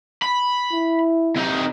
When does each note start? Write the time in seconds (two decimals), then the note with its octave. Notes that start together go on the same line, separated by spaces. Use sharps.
0.22 B5
0.73 E4
1.36 C3 D#4